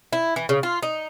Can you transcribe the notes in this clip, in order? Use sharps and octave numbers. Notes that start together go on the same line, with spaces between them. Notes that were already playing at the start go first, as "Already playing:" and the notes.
E4
E3
C#3
F4
D#4